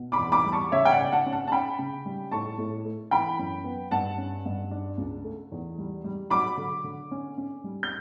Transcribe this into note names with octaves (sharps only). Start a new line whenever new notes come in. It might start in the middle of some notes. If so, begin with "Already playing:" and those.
Already playing: B2
B5 D6
E2
B5 D6
G3
A5 C#6
C#3 C#5 E5
G5
D5 F#5
C#3
F#5 A5
C#4
F#5 A5
A5
C#4 G5 B5
C#3
G3
A2 A5 C#6
A2
A3
E3 G5 B5
F#2
B3
G2 F#5 A5
C#4
G2
D4
C#2
A3
E2
G3
G3
F#3 B5 D6
D3
D3
C#4
C#4
G3
G6